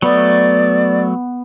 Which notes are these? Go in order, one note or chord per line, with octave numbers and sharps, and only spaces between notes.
F#3 A3 B3 D5